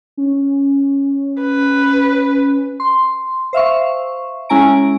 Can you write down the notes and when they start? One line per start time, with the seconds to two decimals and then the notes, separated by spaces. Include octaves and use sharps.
0.17 C#4
1.42 B4
2.80 C6
3.53 C5 E5 F5 C#6
4.49 G#3 C#4 E4 G#5 A#5 D7